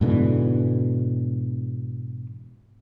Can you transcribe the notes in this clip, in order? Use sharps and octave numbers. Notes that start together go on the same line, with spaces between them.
G#2 B2 D3 E3